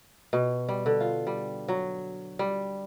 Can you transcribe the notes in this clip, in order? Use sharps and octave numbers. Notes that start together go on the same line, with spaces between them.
B2
G3
D3
F4
G3
F#3
G3